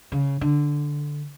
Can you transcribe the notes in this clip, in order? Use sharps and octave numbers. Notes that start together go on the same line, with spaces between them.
C#3
D3